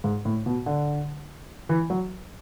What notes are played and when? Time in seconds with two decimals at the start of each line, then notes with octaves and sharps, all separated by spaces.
0.04 G#2
0.25 A2
0.46 B2
0.66 D3
1.69 E3
1.90 F#3